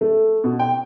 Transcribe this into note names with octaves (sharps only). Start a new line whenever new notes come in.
A3
B2
G5